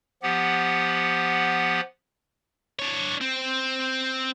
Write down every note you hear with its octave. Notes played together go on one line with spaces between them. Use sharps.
F3 B3 G4 F#5
D4 C#5
C4